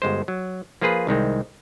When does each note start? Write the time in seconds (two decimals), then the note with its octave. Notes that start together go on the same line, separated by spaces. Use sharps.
0.02 G1 G#3 C5
0.28 F#3
0.81 F3 A#3 F4 G#4 B4
1.07 C2 D#3 G#3 C4